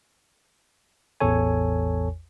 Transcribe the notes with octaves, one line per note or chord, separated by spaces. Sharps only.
A1 E2 A4 C#5 G#5